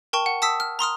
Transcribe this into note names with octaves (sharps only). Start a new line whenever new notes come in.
A#4 G5 A5 C#6
F#5
A5 D#6 E6 B6
F6
A#5 C6 D#6 F6